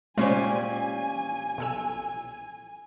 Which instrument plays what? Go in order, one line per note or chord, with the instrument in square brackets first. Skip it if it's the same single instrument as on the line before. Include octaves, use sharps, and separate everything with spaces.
[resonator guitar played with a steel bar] A#2 C#4 G4 [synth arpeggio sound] G#3 C5 [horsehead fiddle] G#5
[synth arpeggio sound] B1 A4 E6